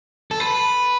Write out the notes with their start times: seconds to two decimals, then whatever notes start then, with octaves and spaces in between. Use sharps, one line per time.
0.31 A4
0.40 B4